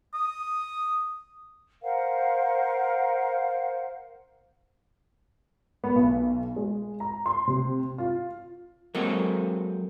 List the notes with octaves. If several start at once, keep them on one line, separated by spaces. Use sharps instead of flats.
D#6
A#4 C5 F5 F#5
B3
B1
G#3
A#5
C6
C3
F4
F#3 G#3 A#3 C4 A4